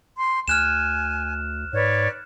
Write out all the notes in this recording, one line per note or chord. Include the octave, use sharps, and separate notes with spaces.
C6
D2 G#5 F6 F#6 E7
G#2 B4 C#5 D5